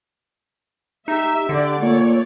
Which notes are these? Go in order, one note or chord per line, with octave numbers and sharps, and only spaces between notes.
D#4 G4 E5
D3 D4 G4 D5
A#2 A3 C#5 D5